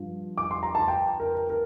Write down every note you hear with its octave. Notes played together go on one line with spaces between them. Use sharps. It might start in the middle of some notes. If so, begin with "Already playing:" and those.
Already playing: G2 F3
D6
C6
A#5
A5
G5
A#4
A#4
A#4